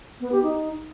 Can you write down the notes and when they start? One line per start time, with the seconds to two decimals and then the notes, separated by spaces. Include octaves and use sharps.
0.21 B3
0.32 G4
0.43 D#4